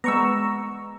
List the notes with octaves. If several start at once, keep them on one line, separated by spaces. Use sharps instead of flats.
G#3 B3 A#5 C#6 E6